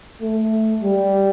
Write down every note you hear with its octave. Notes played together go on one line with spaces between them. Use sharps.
A3
G3